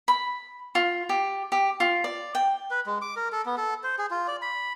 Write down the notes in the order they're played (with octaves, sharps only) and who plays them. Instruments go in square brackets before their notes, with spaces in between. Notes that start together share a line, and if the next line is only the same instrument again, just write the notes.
[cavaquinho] B5
F4
G4
G4
F4
D5
G5
[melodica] B4
G#3
D6
A#4
A4
B3
A4
C5
G#4
F4
D5
B5